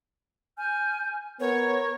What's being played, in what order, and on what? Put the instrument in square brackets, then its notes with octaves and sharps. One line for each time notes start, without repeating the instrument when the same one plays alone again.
[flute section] G#5 F6 G6
[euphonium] B3 [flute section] A#4 [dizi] C#5